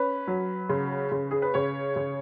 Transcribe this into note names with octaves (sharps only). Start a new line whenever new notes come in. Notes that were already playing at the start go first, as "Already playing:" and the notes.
Already playing: C#4 B4
F#3
C#3
C#3
G#4
B4
C#3 C#5
C#3